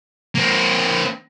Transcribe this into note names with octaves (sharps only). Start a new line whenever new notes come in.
A#3 C4